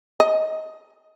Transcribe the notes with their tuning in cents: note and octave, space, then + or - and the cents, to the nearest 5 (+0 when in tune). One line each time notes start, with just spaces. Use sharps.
D#5 +20